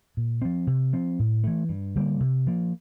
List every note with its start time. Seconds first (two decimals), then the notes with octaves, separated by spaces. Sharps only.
0.17 A#2
0.42 F3 C4
0.67 C3
0.93 F3 C4
1.19 A2
1.44 E3 A3
1.69 G2
1.95 D3 G3 A#3
2.20 C3
2.47 F3 A#3